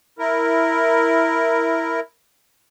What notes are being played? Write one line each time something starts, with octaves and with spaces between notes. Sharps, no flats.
E4 A#4